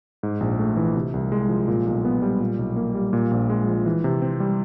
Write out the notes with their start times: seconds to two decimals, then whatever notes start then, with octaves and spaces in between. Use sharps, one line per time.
0.23 G#2
0.40 A#1
0.59 A3
0.77 E3
0.96 C3
1.14 C2
1.32 G#3
1.49 F3
1.68 A#2
1.86 B1
2.05 B3
2.22 G3
2.40 A#2
2.59 B1
2.76 A#3
2.95 G3
3.13 A#2
3.31 A#1
3.50 G#3
3.67 F3
3.85 E3
4.04 C3
4.22 C4
4.40 G3